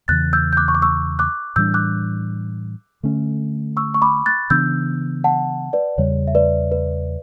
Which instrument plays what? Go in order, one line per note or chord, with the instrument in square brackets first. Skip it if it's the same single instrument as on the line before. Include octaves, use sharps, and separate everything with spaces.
[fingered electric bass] E2 C#3 E3 [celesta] F#6 A6
[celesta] E6 G6
G6
D6 F#6
C#6
D6
C#6 E6
D6 F#6
[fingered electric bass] A2 E3 G3 D4 [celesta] E6 G6
[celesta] D6 F#6
[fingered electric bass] D3 A3 C#4
[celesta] C#6 E6
C#6
B5 D6
F#6 A6
[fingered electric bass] C#3 E3 B3 D4 [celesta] E6 G6
[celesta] F#5 A5
B4 D5
[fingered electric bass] E2 C#3 G3 [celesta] C#5
[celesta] E5
B4 D5
B4